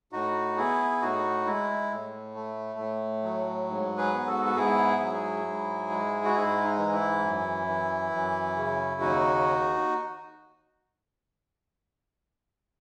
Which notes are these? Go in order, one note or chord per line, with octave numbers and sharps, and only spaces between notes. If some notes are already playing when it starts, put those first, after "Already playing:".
A2 D#4 F#4
B3 E4 G#4
A2 D#4 F#4
G#3 E4
A2
A3
A2
F#3
G#2
G#4 B4
B3
F#4 A4
F#4
G#2 E4 G#4
F#3
G#2
G#3
F#4
G#2 E4
D#4
E3
E4
F#2
E3
F#2
C#3
D#2 D#4 F#4